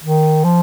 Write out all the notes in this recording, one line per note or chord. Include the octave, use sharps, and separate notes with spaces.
D#3
F3